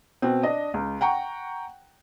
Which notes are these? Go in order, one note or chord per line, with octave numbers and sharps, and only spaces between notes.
B2 C4
D4 D#5
C#2
F#5 G5 A#5 C#6